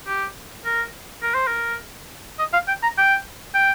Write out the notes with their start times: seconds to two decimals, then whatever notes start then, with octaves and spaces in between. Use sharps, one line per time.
0.07 G4
0.65 A#4
1.23 A#4
1.35 C5
1.47 A#4
2.39 D#5
2.53 F5
2.68 G5
2.83 A#5
2.98 G5
3.55 G5